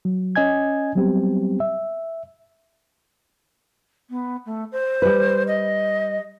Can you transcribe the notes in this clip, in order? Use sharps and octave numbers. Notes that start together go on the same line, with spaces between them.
F#3
C#4 D#5 G#5 G#6
F#3 G3 B3 C4 G4
E5
B3
A3
C5
G3 B4
D#5